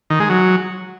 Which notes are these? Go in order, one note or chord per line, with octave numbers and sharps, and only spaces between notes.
D#3
G#3
F#3